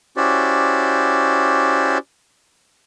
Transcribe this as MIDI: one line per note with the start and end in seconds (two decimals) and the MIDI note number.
0.17 1.98 61
0.17 1.98 64
0.17 1.98 66
0.17 1.98 67
0.17 1.98 72
0.17 1.98 74